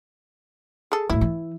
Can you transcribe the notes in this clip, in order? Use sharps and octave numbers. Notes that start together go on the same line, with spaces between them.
G#4 A4
D2 A2 E4
E3